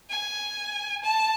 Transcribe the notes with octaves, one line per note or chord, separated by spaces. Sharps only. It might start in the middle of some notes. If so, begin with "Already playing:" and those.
G#5
A5